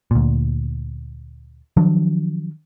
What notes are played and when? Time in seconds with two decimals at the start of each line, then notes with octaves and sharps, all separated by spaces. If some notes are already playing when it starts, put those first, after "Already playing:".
0.11 D2 A#2
1.77 D#3 F3 F#3 D4